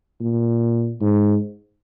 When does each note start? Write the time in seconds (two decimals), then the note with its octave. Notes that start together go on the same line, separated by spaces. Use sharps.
0.21 A#2
1.01 G#2